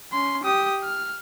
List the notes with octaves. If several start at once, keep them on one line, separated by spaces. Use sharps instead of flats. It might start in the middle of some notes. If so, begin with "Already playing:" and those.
C#4 C6
G4 D#6
F6